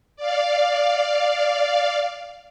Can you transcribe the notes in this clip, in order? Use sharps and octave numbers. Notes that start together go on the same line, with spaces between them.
D5 F5